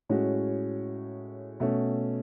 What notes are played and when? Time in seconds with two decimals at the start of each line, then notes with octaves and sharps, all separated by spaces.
0.09 A2 G#3 C#4 F#4
1.60 B2 A3 C#4